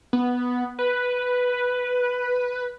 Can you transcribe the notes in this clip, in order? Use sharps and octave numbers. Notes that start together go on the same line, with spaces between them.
B3
B4